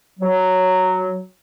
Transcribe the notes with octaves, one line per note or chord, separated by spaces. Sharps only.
F#3